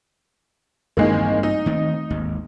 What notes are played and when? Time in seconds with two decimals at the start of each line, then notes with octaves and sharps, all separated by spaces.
0.97 A1 G2 D#3 G#3 A#3 C4
1.43 D#4
1.66 D#3 A3 C4
2.10 G#1 D#2